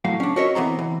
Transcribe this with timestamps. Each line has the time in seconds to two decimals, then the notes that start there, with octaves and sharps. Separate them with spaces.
0.05 A2 F#3 F5
0.20 C#4 D4
0.36 F#4 A#4 C#5 D#5 E5
0.55 E3 B3 C4 A#5
0.79 E3